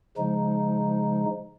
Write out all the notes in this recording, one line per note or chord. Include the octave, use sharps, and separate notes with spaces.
C#3 F3 G#3 D#4